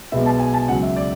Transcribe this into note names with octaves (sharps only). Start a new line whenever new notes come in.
B1 B2 G#3 B3 E5
A5
G#5
A5
C#2 C#3 F#3 F#5
E5
D5